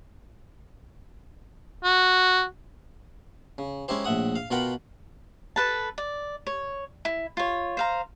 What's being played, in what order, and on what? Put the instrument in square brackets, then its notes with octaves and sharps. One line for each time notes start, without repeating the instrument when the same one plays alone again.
[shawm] F#4
[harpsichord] C#3
G#3 C#4 D#4 E4 G4 C5
A#1 A2 E5 F#5 D#6
F5
B2 F4 A#4 F#5 G5 B5
[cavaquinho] A4 B4 A5
D5
C#5
E4
F4 C#5
C5 F5 A#5